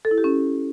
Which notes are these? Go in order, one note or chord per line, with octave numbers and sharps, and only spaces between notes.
A4
E4
G4
C#4